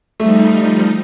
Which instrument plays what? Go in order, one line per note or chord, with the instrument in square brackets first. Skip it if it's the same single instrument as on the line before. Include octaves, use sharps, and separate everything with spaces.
[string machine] F3 G3 D#4 [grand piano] A3